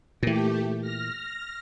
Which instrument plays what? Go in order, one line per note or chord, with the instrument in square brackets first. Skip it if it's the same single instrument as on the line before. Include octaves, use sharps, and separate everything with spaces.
[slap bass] A#2 E3 [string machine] A3 G4
[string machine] F6 A#6